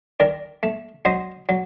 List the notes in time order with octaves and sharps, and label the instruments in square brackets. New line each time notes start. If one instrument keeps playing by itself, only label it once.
[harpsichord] D#3 A#4 D5
A3
F#3 C5 D#5
F#3